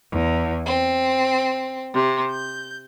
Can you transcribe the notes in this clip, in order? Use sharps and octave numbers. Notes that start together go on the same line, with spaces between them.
E2
C4
C3
G6